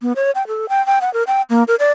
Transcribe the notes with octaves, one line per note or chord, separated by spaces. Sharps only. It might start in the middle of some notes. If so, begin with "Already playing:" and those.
B3
C#5
G5
A4
G5
G5
F#5
A#4
G5
A#3
A#4
D5